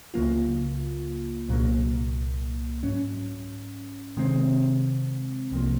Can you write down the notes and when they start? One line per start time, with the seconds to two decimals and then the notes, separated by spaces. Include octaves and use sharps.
0.14 C#2 C#3 F#3 A#3 F4
1.49 C2 A#2 F#3 A#3
2.83 G#2 F#3 C#4
4.17 C3 D#3 G#3 C4
5.52 C2 C3 F3 A#3